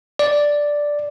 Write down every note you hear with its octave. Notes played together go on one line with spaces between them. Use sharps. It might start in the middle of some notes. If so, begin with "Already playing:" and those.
D5